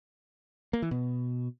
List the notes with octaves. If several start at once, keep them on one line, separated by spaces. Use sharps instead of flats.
A#3
E3
B2